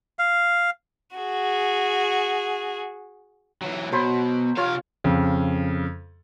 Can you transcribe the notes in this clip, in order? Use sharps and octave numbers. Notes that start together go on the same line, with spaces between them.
F5
F#4 G#4
E3 F#3
B2 F#3 C5 B5
C3 F4 C#5 F5
F2 C#3